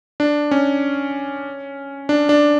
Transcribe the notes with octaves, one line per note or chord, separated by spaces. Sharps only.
D4
C#4
D4
D4